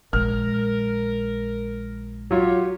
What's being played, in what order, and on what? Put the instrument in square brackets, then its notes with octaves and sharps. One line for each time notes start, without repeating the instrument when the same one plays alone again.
[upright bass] A#1 G#3 [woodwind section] A#4 [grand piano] F6
[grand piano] F#3 F4 [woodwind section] G4 C#5